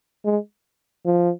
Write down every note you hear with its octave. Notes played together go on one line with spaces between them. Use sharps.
G#3
F3